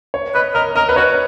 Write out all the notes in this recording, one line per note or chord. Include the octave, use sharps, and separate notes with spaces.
C#5
B4 D#5
A#4 D#5
A#4 D#5
B4
F#4 C#5